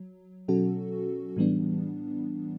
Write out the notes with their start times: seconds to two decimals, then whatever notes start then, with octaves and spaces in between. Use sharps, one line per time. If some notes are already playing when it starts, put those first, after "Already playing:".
Already playing: F#3
0.48 B2 F#3 C#4 F#4 A4
1.37 A2 E3 G3 B3 D4